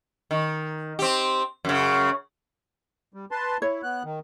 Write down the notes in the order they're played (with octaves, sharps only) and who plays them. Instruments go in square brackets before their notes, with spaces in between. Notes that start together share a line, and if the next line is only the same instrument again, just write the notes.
[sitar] D#3
C4 G4
F#2 C#3
[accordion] G3
B4 A5 C6
[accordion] E4 [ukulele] C#5
[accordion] B3 F#6
D#3